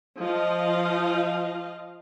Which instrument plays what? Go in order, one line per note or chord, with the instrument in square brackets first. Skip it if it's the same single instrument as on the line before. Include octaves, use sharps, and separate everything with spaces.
[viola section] F3 D#5 F5